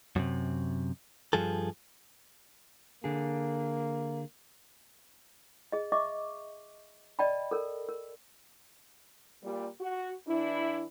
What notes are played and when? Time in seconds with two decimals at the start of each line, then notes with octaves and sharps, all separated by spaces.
0.16 F#2 A2 C3
1.33 G2 F3 G#4 A4
3.04 D3 A#3 G#4
5.72 G#4 D#5
5.92 D#5 E5 C#6 D6
7.19 D5 D#5 G5 A5 B5
7.51 A4 A#4
7.89 A#4
9.43 A#2 G3
9.80 F#4
10.28 E3 D4 E4